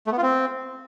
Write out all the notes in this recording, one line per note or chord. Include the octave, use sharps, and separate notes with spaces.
A3
B3
F4
C4